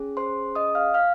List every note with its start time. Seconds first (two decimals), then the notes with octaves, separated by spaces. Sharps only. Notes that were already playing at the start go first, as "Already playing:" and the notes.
Already playing: C#4 G#4
0.17 C5 C6
0.55 D#5 D#6
0.75 F5 F6
0.94 F5 F6